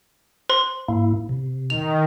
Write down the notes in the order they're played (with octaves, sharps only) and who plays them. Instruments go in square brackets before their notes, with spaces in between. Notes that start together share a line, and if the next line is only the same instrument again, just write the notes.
[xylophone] C5 C6
[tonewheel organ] G#2 A#3 E4
C3
[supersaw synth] D#3 [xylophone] F7